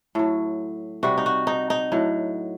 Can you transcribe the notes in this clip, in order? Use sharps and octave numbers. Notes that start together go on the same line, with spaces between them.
A2 F#3
C3 G3 F#4
D#4
F#4
D#4
D#4
A2 F#3